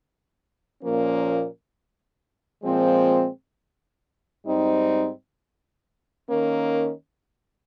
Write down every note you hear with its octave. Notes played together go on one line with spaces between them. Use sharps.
A#2 F3 A#3 C#4
A#2 F3 G#3 C4
G#2 G3 C4 D#4
D#3 A#3 C#4